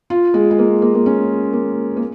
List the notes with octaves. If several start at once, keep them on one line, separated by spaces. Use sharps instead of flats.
F4
G#3
G#3
A#3
A#3
A#3
C#4
A#3
A#3